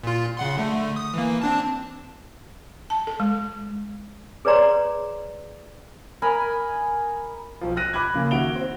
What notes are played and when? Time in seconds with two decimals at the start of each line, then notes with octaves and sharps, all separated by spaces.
0.04 A#2 F4
0.37 C#3 F#5 C6
0.58 D3 A3
0.96 D#6
1.14 E3 A#3
1.41 C4 D4 A5
2.90 A5
3.07 A4
3.20 G#3
4.45 G#4 B4 C#5 D5 A#5 C6
6.22 A#4 D#5 G#5 B5
7.61 B1 F3
7.76 F6 F#6 A#6 D#7
7.93 B5 D6 F#6 G#6
8.14 C#3 A#3
8.31 D#3 F#4 E5 D7 F7 G7
8.56 C4